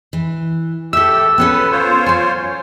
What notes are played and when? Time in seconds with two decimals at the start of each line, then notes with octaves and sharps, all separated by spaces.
0.13 E3
0.93 G4 A4 E5 E6
1.38 B3 C#4 A4 B4
1.71 F4 C5 C#5
2.06 F#3 G#5